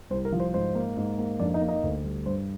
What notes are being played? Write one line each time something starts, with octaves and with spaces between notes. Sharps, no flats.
C2 C5
A#4
F3
C5
G#2 C5
A#3
G#2
A#3
F2 D4 D5
D#4 D#5
A#3
D#4 D#5
D2
G3
G2 C5